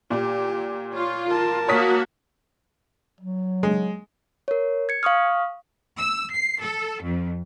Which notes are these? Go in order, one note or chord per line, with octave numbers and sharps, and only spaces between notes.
A#2 G4
F4 C#5
A#4 A5
A#3 F#4 C#5 D#6 B6
F#3
G#3
A#4 C#5
G#6 C#7
F5 C#6 D#6 F6
E6
C7
A4
F2